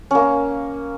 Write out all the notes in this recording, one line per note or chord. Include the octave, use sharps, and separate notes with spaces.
A#3 C#4